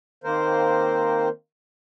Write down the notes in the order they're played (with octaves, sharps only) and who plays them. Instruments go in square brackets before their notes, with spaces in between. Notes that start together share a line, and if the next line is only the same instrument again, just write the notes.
[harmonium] D#3 A#3 C4 A#4 C5